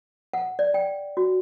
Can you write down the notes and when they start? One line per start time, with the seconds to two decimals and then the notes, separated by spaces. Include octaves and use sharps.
0.34 F#5
0.59 D5
0.74 G5
1.17 F#4